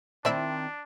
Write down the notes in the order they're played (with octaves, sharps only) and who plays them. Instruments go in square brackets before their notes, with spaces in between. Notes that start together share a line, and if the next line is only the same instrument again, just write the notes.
[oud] D#3 C4 E4 [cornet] D4 [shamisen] C5 D5 E5